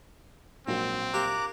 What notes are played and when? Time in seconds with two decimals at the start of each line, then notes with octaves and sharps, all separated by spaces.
0.68 A#1 G#2 F#3 C4 A#4
1.14 A#3 G4 A#5 D6 F#6